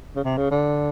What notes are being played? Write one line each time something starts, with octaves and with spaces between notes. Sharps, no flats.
C#3
C3
C#3
D3